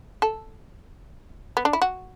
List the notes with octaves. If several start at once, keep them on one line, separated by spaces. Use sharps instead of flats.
A4
B3
D4
E4
F#4